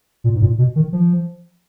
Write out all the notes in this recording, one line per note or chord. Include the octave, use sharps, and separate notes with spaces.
A#2
G#2
A#2
B2
D#3
F3